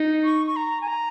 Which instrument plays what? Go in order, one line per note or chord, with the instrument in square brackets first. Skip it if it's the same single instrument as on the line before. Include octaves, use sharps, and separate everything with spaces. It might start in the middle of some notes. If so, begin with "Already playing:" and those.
Already playing: [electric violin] D#4
[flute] C#6
C#6
A#5
G#5
A#5